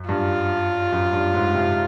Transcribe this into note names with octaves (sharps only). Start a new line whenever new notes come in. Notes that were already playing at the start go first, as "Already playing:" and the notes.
Already playing: F#2
G2 F4
F#2
G2
G#2
C3